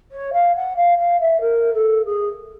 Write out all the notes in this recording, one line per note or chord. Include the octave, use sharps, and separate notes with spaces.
C#5
F5
F#5
F5
F5
E5
A#4
A4
G#4